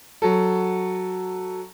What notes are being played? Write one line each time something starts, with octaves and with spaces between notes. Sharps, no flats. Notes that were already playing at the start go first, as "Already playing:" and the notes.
F#3 A4